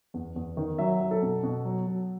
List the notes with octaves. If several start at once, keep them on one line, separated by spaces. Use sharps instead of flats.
E2
E2
D#3
F#3 E5
F#3
A4
B2
B2
F#3
F#3